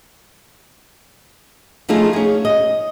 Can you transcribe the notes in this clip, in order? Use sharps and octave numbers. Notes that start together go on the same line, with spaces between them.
F3 A3 D#4 F4 G#4
C#4 G#4
D#5